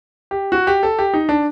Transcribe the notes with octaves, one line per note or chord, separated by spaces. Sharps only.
G4
F#4
G4
A4
G4
D#4
D4